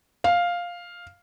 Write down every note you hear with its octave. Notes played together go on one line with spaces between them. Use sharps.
F5